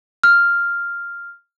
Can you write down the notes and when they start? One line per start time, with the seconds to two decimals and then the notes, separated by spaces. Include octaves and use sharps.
0.23 F6